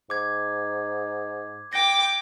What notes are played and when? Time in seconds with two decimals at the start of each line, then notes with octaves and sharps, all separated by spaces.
0.10 G#2 D6 G#6
1.73 G5 D6 A#6